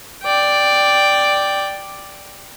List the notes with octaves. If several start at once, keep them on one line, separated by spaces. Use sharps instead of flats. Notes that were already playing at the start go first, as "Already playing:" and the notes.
D5 G5